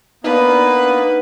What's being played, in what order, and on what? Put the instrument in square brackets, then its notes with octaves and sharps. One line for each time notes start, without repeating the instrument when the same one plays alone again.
[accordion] A#3 B3 [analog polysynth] D4 D#4 [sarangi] B4